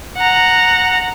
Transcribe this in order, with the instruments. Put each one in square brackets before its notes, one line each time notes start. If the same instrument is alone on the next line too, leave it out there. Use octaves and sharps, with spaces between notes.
[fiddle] F#5 A#5